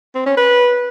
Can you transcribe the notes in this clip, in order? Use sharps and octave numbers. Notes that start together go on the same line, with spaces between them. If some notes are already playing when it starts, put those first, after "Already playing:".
C4
C#4
B4